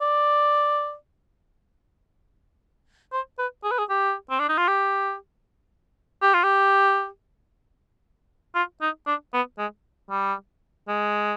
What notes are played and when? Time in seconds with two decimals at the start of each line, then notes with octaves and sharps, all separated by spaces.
0.02 D5
3.13 C5
3.39 B4
3.64 G#4
3.71 B4
3.79 G#4
3.89 G4
4.30 C4
4.40 D4
4.49 D#4
4.58 F4
4.68 G4
6.22 G4
6.34 F4
6.44 G4
8.55 F4
8.81 D#4
9.07 D4
9.33 B3
9.58 G#3
10.10 G3
10.88 G#3